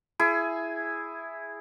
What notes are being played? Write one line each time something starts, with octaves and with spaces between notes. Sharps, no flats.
E4 G#4